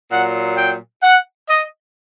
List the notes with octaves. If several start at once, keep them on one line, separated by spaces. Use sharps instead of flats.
A#2 F#3 F#5
G5
F#5
D#5